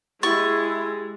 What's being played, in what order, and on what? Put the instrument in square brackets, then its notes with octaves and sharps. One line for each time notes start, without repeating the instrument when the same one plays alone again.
[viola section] G#3 [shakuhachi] E4 [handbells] G4 A6 [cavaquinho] C#6